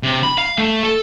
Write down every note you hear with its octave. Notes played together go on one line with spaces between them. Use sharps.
C3
B5
F5
A3
A4